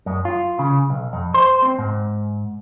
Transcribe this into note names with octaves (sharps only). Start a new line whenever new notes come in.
F#2
F4
C#3
B1
F2
C5
C4
G#2